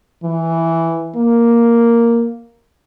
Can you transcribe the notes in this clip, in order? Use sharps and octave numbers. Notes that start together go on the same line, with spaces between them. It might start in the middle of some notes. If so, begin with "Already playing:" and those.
E3
A#3